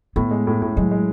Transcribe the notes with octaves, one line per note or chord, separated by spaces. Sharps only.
A2 B3
G#3
A2
A2
F#3 G#3
G#3